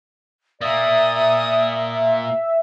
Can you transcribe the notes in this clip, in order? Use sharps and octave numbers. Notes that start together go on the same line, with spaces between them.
A#2 A#3 D5 E5 D#6